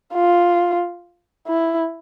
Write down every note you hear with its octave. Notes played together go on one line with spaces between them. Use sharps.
F4
E4